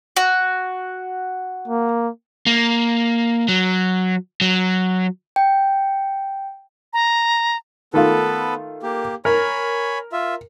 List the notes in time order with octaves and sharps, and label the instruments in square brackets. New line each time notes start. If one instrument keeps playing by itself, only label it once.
[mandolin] F#4
[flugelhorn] A#3
[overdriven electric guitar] A#3
F#3
F#3
[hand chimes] G5
[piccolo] A#5
[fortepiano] D#3 A3 F4 [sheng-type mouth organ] B3 A4 B4
[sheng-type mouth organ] A#3 G4
[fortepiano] A#4 [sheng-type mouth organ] C#5 G#5 B5
[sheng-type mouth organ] F4 E5